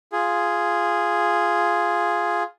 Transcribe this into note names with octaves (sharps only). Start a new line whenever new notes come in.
F4 G#4